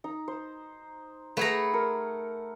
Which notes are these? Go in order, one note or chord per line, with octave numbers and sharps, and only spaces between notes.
D#4 A#5
C5
A3 G#4 B4 F#5 A#5 B5
A#4